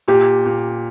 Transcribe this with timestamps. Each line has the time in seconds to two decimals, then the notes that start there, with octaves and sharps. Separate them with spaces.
0.08 A#2 G4
0.46 A#2